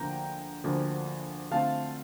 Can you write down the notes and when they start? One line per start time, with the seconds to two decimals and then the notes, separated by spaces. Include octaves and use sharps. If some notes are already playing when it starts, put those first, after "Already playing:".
Already playing: D2 D3 F3 A#3 G5 A#5
0.64 D2 D3 F3 A#3
1.51 D3 A3 C4 F4 F5 A5